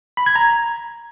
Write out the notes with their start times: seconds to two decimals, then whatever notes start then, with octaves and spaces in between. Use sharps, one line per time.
0.17 B5
0.26 G#6
0.36 A#5